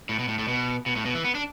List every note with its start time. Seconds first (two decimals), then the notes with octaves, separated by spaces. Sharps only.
0.09 A2
0.19 B2
0.28 A2
0.39 A2
0.48 B2
0.86 B2
0.96 A2
1.05 B2
1.15 E3
1.24 B3
1.35 D4